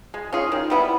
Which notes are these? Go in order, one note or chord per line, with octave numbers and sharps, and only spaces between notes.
G#3
C#4 F4 G#4
D#3
G3 B3 E4